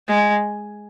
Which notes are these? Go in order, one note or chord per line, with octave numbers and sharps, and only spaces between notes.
G#3